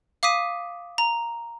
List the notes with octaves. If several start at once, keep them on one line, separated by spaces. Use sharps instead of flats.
F5 D6 D#6 B6 D#7
A#5